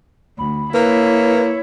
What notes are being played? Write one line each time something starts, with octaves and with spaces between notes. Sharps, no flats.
D2 B5
A#3 E4 B4 C#5